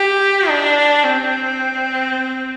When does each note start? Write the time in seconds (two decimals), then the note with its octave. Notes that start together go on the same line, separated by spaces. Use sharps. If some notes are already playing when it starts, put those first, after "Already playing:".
Already playing: G4
0.49 D4
1.04 C4